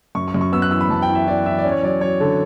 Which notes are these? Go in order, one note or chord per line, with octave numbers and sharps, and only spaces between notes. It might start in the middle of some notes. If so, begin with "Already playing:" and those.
F#2 C#6
C#6
F#2
C#6
B3 E6
F#6
E3 E6
B5
F#2 A5
G5
E3
E5
E3 D5
E3 E5
D5
C#4
C#5
F#3 D5
F#3 C#5
D3 A4